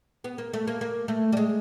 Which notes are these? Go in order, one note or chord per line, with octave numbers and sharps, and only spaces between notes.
B3
A#3
A3
A#3
A#3
A3
G3
G#3